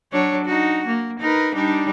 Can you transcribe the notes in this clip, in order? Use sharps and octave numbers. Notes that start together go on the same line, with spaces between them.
F#3 D4 C#5
D#4 F#4
A#3
D#4 A#4 B4
G3 D4 D#4